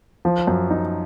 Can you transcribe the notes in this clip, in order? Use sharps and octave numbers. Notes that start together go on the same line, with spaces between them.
F3
F#2
D#4